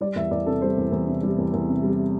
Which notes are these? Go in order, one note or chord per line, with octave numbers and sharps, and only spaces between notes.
G3 D5
E2 E5
E2 D5
C3 A4
G3 C5
E2
E2
C3
G3
E2
E2
C3
G3